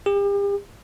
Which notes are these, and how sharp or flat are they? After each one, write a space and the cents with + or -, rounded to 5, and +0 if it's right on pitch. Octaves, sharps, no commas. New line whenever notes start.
G4 +40